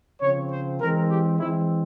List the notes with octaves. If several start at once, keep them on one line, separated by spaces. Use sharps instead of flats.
C#3 F3 C4 C#5
C5
E3 G#3 C4 A#4
G4
E3 G#3 C4 E4